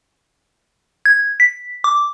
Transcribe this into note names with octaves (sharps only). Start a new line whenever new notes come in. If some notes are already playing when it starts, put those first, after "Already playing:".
G#6
B6
D6